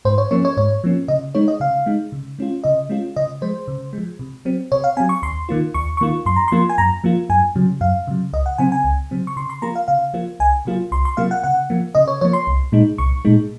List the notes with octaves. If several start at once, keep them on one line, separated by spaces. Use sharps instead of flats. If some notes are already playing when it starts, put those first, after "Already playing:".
G#2 C5
C#5
F3 A#3 C#4 C#5
C#5
G#2 C#5
F3 A#3 C#4
C#3 D#5
G#3 D#4 C#5
D#5
C#3 F5
G#3 D#4
C#3
G#3 C#4 F4
C#3 D#5
G#3 C#4 F4
C#3 D#5
F3 G#3 C5
C#3
F3 G#3
C3
F#3 C4
C3 C#5
F5
F#3 C4 G#5
C#6
D#2 C6
D#3 A#3 F4
D#2 C#6
C#6
D#3 A#3 F4
F#2 C6
A#5
F3 A#3 F4 C6
G#5
F#2 A#5
F3 A#3 F4
F#2 G#5
C#3 F#3
F#2 F5
C#3 F#3
C#2 D#5
F#5
C#3 F#3 C4 G#5
G#5
C#2
C#3 F#3 C4
C#6
C#3 C6
C6
F3 A#3 F4 A#5
F5
C#3 F5
F3 A#3 F4
C2 G#5
C3 F#3 A#3 F4
C2 C6
C6
C3 F#3 A#3 F4 F5
F#5
C#3 F#5
F3 A#3
C#3 D#5
C#5
F3 A#3 C#5
C6
C2
A#2 G#3 D#4
C2 C#6
A#2 G#3 D#4